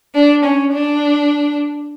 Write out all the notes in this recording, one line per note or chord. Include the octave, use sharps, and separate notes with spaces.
D4
C#4
D4